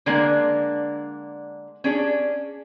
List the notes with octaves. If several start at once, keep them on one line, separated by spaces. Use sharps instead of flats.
D3 G#3 A#3 D4
C#4 D4 G#4